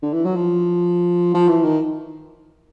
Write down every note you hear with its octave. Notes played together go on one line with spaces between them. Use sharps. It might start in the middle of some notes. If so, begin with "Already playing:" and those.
D3
E3
F#3
F3
F3
E3
D#3